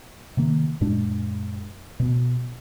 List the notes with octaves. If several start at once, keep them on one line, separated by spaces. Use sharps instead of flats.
C3 D#3 A#3
F#2 A#2 G#3 D4
B2 B3